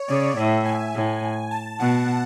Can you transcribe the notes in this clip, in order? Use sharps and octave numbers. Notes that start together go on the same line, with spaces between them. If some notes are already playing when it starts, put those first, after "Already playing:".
Already playing: C#5
C#3 D5
A2 E5
G#5
A2
A5
B2 F#5